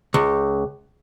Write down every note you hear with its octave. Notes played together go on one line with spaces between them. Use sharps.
C#2